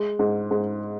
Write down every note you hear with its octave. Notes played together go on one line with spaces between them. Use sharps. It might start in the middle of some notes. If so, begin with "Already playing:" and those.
Already playing: G#3
G#2
G#2